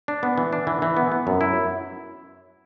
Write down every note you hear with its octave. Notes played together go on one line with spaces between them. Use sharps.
D4
B3
E3
D4
E3
E3
B3
B3
F#2
E4